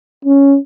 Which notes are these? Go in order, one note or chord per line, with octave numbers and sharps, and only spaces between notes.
C#4